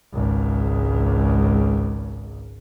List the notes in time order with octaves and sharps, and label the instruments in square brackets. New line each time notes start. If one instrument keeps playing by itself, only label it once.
[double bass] G#1 C#2